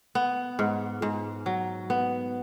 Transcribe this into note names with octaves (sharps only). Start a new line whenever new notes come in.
B3
G#2
G#2
F#3
B3